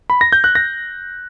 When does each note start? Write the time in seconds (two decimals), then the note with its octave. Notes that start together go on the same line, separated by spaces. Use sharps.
0.10 B5
0.21 A#6
0.32 G6
0.44 F#6
0.55 A#6